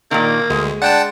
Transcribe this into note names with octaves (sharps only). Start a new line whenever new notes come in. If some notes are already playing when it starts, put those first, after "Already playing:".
A#2 D#3 A#3
D2 G#3
D4 F#5 G5 A5